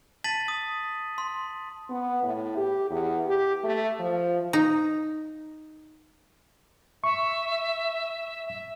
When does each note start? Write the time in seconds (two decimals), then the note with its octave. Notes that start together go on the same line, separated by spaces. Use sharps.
0.24 A5 A6 B6 D#7 F#7
0.48 D#6
1.18 C6
1.89 B3
2.23 A2
2.57 G4
2.90 E2
3.26 G4
3.64 A3
3.99 F3
4.53 D#4
7.04 E5 C#6
8.47 E5